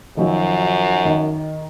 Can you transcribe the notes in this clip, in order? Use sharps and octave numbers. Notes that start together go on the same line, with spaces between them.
F#2 D#3 F3 F#3
D#3